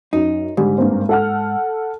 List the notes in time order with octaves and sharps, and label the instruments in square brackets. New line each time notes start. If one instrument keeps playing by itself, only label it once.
[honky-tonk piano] F#2 [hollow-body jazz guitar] D#4
[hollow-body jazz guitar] G#2 [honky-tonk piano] D3 G3
[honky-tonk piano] G2 A#3 C4
A4 F#5 F6